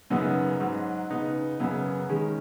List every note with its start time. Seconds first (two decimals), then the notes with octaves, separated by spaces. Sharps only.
0.10 F#2 C#3 F#3 B3 D#4
0.60 G#2 F#3 D#4
1.10 C#3 B3 D#4
1.60 F#2 C#3 F#3 B3
2.09 D#3 G#3 C#4